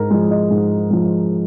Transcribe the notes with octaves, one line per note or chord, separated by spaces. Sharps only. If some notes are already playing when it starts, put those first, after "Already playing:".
Already playing: G#2 A#4
F3 G#3
D#5
G#2
F3 G#3